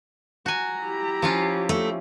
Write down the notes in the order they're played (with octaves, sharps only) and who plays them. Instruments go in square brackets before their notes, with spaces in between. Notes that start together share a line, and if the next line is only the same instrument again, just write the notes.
[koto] F#4 G#5 [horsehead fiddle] A#5
[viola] E4 G4
[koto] F3 C#4 F4
[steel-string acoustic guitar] A3